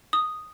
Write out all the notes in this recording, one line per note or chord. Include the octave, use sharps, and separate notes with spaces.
D#6